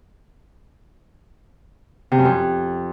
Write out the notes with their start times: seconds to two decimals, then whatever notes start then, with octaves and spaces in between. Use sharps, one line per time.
2.12 C3
2.18 F#2
2.25 F2